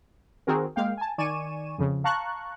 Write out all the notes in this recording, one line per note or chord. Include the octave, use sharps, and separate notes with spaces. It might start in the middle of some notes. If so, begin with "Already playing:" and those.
D#3 C4 F#4 G#4 A#4
G#3 A#3 F5 G5
G#5 A5
D#3 D5 G#5 C#6 D#7 E7
F2 C#3
F5 A5 A#5 C#6 F#6